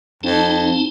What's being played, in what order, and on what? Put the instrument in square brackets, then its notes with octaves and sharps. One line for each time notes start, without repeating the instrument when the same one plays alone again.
[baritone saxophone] F2 [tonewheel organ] C4 D#4 A5